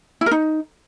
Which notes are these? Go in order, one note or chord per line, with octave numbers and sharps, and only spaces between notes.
E4
A#4
D#4